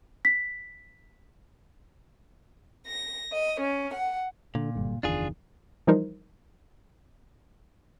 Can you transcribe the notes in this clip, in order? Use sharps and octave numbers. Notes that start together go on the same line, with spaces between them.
B6
A#6
D#5
C#4
F#5
A#2 D3
F#1 G2 D3
F#1 E2 D#3 D4 F4 G#4
E3 F3 G3 D#4 A#4 C5